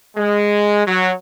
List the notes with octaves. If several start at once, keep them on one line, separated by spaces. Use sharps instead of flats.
G#3
F#3